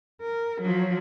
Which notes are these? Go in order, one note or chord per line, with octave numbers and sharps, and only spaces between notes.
A#4
F3 F#3